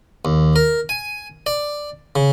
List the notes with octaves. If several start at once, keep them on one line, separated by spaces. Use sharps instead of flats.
D#2
A#4
G#5
D5
C#3